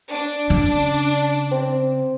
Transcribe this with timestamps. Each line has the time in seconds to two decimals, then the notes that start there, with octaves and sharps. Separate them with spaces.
0.12 D4
0.50 C#3 C#4
1.52 C4